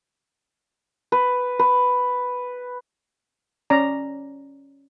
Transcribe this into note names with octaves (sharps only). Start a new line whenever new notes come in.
B4
B4
C#4 D5 A#5